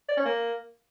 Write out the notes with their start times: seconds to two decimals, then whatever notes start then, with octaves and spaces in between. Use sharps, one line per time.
0.09 D5
0.17 C#4
0.25 A#3